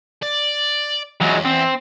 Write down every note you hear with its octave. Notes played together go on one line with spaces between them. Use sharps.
D5
E2 F#3 G#3
C4